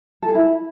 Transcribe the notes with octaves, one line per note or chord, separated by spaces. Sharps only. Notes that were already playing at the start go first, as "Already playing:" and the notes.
A4
G#4
E4